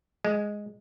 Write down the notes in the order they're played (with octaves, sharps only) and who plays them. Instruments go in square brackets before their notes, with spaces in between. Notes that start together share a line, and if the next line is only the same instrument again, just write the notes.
[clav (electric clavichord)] G#3